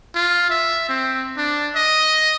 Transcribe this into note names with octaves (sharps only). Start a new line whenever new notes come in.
F4
E5
C4
D4
D#5